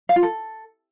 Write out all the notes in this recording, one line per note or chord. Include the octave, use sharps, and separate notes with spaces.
F5
F4
A4